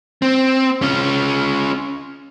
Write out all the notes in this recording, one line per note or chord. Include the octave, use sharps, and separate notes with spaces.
C4
C#4 F4